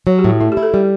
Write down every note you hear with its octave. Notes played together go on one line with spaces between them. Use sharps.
F#3 C#5
G4
A2
F#4
A3 E4
G4
E4
A4
G3 G4